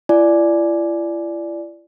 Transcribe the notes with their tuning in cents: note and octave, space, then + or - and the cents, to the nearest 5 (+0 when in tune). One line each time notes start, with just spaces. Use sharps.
E4 +40 D5 +0 G#5 +20